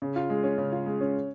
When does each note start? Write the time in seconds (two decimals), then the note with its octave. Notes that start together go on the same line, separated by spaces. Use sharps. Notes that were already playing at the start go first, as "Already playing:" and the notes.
0.02 C#3
0.16 F4
0.30 G#3
0.43 C#4
0.58 C#3
0.72 F4
0.86 G#3
1.01 C#4